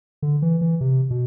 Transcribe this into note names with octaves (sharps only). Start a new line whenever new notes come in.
D3
E3
E3
C3
B2